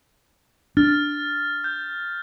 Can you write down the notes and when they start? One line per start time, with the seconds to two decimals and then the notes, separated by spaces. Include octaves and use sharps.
0.77 D4 F6 A6
1.64 G6